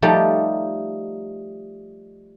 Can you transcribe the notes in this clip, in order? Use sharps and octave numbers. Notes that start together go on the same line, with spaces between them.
F3 G3 A3 D#4 G4